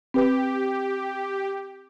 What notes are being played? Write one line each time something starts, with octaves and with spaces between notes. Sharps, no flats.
C4 G4 B4